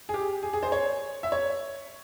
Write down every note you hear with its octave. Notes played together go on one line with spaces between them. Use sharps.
G#4
G4
G#4
G#4
C5
C#5
E5
C#5